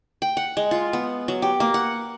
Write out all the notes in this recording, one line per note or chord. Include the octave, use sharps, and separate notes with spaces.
G5
F#5
G#3
F4
B3
F#3
G4
A#3
F#5